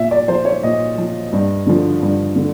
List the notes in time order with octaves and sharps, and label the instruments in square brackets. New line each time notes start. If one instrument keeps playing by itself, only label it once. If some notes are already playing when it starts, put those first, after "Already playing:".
Already playing: [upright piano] A#2 E5
D5
F3 C5
C#5
A#2 D#5
F3
G2
D3 F3
G2
D3